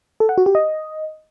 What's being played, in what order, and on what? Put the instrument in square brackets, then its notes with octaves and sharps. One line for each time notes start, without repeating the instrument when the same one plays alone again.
[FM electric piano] A4
F#5
F#4
G4
D#5